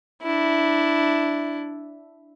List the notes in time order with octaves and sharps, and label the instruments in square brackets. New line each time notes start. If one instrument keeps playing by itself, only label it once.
[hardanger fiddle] D4 E4